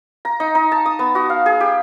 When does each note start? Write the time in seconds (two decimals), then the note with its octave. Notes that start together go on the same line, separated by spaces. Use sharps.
0.25 A#5
0.40 D#4
0.55 D#4
0.72 A5
0.86 D#6
0.99 B3
1.15 F#4
1.30 F5
1.46 G#4
1.60 G4